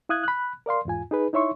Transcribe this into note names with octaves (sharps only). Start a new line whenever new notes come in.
E4 F5 D#6 F#6 G#6
B5 F#6
A#4 D5 F5 C6
E2 G#2 F4 G#5
D#4 G#4 B4
D#4 E4 C#5 E5 C6 C#6